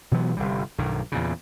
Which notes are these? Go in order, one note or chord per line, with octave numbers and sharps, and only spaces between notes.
B2 E3 F#3 B3
G1 C3 G3
B1 G2 D#3
E2 A#2 C#3